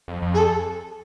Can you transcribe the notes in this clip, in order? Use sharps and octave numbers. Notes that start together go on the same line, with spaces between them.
F2
F2
G#4
A4